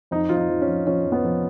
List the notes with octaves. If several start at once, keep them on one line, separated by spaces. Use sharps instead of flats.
F2 D#4
F2 F4
D#4
F3
C#4
F3
F3 C#4
F2
B3
F3